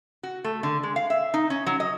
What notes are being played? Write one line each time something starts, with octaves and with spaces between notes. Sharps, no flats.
F#4
A3
D3
G#3
F5
E5
D#4
C#4
F#3
D#5